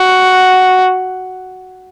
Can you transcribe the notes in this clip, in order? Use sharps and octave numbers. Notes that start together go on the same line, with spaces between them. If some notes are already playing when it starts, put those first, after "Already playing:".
Already playing: F#4